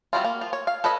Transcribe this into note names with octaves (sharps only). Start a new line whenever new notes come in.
F#3 G3 C4 E4 F4
A#3
F3 F4
C#5
F5
A4 B4 C#5 D#5 B5